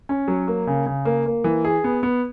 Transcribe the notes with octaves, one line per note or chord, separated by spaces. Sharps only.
C#4
F#3
A#3
C#3
C#3
A#3
A#3
E3
G#4
B3
B3